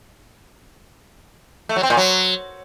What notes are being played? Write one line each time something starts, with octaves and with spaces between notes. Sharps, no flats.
A3
F#3
C4
A#2
F#3